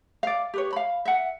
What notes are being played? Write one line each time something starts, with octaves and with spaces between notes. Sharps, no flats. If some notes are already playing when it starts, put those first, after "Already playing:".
D5 F5
G4 B4 C#5
F5 B5
E5 F#5